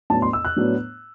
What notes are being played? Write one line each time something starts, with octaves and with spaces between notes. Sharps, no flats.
A2 F#3 B3 D4 A5
C6
E6
F#6
A2 F#3 B3 D4